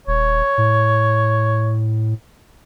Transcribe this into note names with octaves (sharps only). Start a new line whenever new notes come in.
D#1 C#5
A2